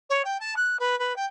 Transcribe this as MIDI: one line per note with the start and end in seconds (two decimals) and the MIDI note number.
0.10 0.22 73
0.25 0.38 79
0.40 0.54 81
0.56 0.77 90
0.79 0.98 71
0.99 1.15 71
1.16 1.26 79